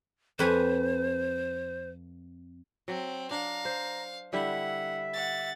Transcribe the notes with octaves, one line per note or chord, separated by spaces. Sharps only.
F2 B4 C5 G#5
F#3 C4
D4 F5 A#5
C5
D3 G3 E4 E5 F#5
F#5 A6